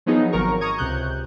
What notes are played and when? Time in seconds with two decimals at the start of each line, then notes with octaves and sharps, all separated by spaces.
0.06 F3 F#3 B3 D#4 G#4
0.32 G#1 D#3 F#3 A#4 A#5 C#6
0.61 A#5 C#6 D#6 G#6
0.78 C#2 C3 F#6 G6